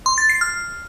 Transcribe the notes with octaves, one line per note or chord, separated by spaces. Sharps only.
C6
A6
C7
F6